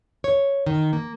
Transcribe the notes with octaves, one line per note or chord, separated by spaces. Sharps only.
C#5
D#3
A#3